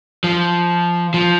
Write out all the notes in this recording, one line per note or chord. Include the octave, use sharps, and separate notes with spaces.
F3
F3